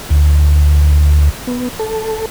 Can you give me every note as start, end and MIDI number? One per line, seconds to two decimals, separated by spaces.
0.10 1.29 38
1.47 1.69 59
1.79 2.26 69